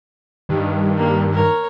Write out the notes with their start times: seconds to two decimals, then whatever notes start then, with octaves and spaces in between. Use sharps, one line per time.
0.49 G2 D#3
0.97 A#3
1.33 A#4 C#5